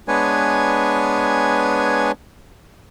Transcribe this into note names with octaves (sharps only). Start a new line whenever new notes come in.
G#3 B3 D4 B4 C#5 G#5